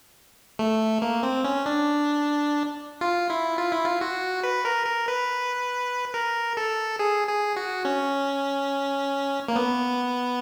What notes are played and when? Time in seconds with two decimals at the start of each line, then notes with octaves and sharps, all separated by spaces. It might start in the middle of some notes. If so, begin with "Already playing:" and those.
0.59 A3
1.02 A#3
1.23 C4
1.45 C#4
1.66 D4
3.01 F4
3.30 E4
3.58 F4
3.72 E4
3.86 F4
4.01 F#4
4.44 B4
4.65 A#4
4.86 A#4
5.08 B4
6.14 A#4
6.57 A4
6.99 G#4
7.28 G#4
7.56 F#4
7.85 C#4
9.48 A#3
9.56 B3